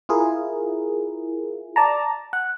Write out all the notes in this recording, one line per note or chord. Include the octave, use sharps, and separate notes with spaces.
E4 F4 G#4 A#4
D5 A5 A#5
F#5